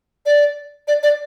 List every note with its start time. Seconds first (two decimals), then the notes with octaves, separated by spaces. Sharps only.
0.26 D5
0.88 D5
1.03 D5